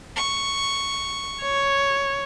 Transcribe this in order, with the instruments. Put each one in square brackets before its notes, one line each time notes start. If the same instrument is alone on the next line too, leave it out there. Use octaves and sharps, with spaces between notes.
[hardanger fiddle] C#6
[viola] C#5